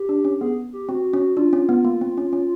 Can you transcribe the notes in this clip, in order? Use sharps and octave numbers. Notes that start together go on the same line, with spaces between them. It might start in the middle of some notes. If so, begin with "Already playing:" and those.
Already playing: G4
D4
C#4
B3 G#4
G4
C4 F#4
C#4
D4 F4
C#4
B3
A#3
C4
C#4
C#4